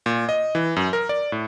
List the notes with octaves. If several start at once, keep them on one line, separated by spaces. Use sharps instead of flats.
A#2
D#5
E3
F#2
A#4
D5
A2